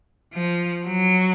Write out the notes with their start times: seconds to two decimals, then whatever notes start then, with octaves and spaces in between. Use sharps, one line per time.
0.34 F3
0.86 F#3